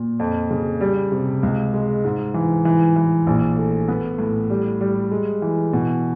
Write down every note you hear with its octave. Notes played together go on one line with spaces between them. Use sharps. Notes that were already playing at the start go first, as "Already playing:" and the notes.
Already playing: A#2
F2
C#3
G3
C3
C#2
G#3
G#2
E3
E3
E3
A#1
A3
B3
A2
G3
G3
G#3
E3
B2